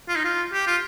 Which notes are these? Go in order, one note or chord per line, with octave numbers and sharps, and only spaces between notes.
F4
D#4
F4
G4
F4